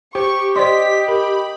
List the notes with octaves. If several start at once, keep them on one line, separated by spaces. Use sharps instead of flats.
G4 C5 C#6
C5 D5 D#5 C6 B6
A#4 B5